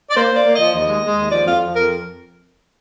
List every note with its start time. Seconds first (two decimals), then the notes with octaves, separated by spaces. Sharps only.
0.11 D5
0.15 A#3 C5
0.30 A#3 D5
0.45 A#3
0.54 F3 D#5
0.73 D#2 D#5
0.88 G#3
1.02 G#3
1.17 D#2
1.31 F3 D5
1.46 F2 F4
1.60 F3
1.74 F2 A#4